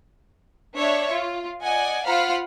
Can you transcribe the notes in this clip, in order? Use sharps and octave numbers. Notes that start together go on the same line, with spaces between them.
D4 C#5 E5
F4
D5 D#5 F#5 G#5
F4 C5 F5 F#5 B5 F6